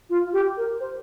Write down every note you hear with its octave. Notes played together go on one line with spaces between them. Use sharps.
F4
G4
A#4
C5